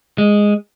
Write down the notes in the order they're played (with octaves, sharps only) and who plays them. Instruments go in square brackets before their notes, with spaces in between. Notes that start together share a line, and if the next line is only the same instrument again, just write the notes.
[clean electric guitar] G#3